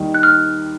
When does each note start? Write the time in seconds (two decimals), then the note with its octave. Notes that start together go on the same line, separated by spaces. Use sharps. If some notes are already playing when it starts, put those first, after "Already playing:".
Already playing: D#2 D#3 G3
0.14 F#6
0.23 F6